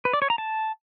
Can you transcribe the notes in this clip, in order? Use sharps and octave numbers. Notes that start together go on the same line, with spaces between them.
B4
D5
C#5
A#5
A5